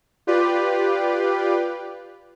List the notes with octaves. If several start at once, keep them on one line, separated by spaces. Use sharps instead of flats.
F4 G4 B4 D5